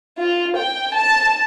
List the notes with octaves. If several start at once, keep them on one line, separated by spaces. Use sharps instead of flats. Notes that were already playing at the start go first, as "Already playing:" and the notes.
F4
G5
A5